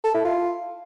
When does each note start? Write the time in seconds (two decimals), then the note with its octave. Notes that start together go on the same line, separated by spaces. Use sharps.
0.04 A4
0.14 E4
0.25 F4